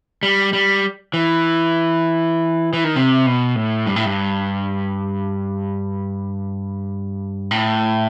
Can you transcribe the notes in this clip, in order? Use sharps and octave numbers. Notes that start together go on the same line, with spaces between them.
G3
G3
E3
E3
D#3
C3
B2
A2
G2
A2
G2
A2